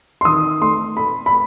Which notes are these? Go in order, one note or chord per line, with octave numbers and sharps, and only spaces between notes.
C6
D#3 D#6
A3 C6
A3 B5
B5